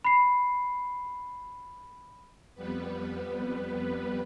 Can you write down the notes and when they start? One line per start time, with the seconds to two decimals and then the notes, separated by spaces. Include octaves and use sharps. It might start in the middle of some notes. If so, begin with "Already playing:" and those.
0.05 B5 C7
2.55 F2 G3 B3 B4